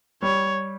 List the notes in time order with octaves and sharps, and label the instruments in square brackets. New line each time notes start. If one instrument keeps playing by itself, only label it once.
[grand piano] G3 [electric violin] C#5